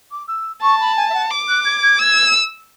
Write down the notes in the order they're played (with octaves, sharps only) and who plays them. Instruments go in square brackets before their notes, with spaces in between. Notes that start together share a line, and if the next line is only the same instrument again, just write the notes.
[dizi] D6
E6
[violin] A5 [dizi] C#6
[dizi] B5
G#5
E5
F#5
[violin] D6
[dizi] F#6
G#6
G#6
[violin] E6 [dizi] G#6